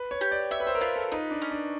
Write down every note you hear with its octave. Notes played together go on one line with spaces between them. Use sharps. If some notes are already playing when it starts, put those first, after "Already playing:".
Already playing: B4
C#5
G4
D5
C#5 E5
B4
C5
A#4
F4 B4
A4
D#4 B4
D4
C#4
D4